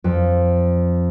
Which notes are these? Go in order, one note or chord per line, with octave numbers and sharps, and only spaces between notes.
F2